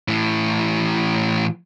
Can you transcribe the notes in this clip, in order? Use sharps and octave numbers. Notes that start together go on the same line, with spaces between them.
A2 E3